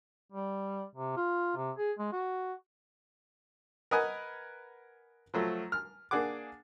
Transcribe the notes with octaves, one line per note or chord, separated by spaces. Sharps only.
G3
C3
F4
C3
G#4
G#3
F#4
A#4 B4 D#5 F#5 G#5
F3 F#3 A3
F6
A#3 D4 G#4 F#5 D6